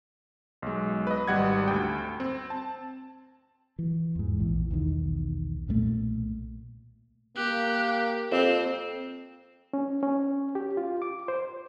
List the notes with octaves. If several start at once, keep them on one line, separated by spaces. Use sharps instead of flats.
B1 G#3
B4 D#5
G#1 G3 F#5 G#6
D2 G5
C4
A5
E3
E2 G#2
A#1 E3
B1 E2 D#3
B1 A#2 G3 A3
A#3 G4 F#6
F2 C4 E7
C#4
C#4
G4
F4
D6
C5